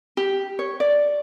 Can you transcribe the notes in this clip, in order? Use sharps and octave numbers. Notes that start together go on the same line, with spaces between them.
G4
C#5
D5